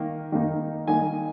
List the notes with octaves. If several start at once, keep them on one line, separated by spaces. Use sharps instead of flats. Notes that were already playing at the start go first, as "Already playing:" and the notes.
Already playing: D#3 A#3
D#3 A#3 D#4
D#3 A#3 D#4 G#5